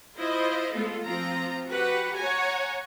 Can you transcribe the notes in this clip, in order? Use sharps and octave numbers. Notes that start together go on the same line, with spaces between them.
E4 F4 C5 D#5
G#3 A3 B3 F4 A4
F3 C4 F4 A#5
F#4 G4 B4 F#5
C#5 F#5 G#5 A#5